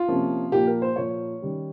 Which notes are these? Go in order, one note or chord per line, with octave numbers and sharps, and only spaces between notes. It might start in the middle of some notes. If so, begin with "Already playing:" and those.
Already playing: F4
C3 F3 A#3 C#4
A#2 F3 A#3 G4
A#4
C5
A#2 F3 A#3 C#5
D#3 G3 C#4